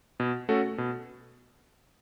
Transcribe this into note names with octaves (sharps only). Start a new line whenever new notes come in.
B2
A3 C#4 F#4 A4
B2